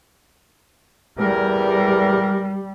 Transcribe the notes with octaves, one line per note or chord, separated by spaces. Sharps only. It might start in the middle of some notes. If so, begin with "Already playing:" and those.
E2 G3 A#4